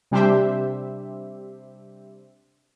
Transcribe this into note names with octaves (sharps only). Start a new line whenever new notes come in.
C3 G3 D4 G4 C5 E5